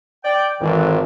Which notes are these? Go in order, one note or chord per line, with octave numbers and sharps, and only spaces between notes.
D5 G5
G#1 F2 E3